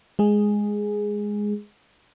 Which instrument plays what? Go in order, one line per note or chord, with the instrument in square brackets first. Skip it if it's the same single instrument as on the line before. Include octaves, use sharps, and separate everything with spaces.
[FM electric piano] G#3 G#4